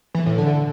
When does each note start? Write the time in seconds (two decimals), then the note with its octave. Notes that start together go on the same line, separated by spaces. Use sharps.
0.15 E3
0.26 A2
0.38 D3